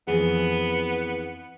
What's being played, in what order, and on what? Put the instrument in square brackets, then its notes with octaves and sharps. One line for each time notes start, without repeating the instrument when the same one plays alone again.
[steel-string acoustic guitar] F2 E3 G#4 [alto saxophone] B3